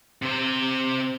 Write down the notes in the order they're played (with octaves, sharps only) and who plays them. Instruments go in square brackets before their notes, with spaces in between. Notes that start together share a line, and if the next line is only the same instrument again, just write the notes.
[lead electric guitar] C3 C5